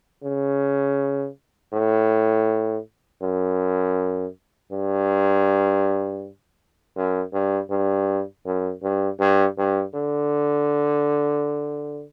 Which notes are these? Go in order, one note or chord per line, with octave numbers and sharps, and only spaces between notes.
C#3
A2
F#2
G2
F#2
G2
G2
F#2
G2
G2
G2
D3